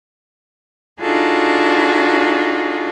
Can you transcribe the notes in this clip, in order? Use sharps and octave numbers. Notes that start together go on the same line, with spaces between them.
D4 D#4 F4 F#4 G#4 A4